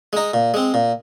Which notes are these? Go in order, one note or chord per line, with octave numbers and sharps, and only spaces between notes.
G#3 D#4
A#2
G#3 C4
A#2